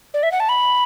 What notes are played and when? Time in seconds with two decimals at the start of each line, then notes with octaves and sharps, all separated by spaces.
0.14 D5
0.23 E5
0.32 F#5
0.40 A5
0.49 B5